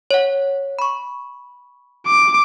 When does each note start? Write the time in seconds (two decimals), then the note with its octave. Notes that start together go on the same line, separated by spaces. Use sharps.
0.11 C#5 F#5
0.79 B5 C#6
2.07 D6